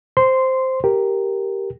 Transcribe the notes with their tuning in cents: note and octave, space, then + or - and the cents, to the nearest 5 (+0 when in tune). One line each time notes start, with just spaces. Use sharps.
C5 +0 C6 -10
G4 +0 A#4 +0